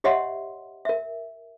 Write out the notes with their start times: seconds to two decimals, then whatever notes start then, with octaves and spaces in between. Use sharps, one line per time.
0.04 G4 C#5 D#5 E5 F#5 C6
0.85 A#4 E5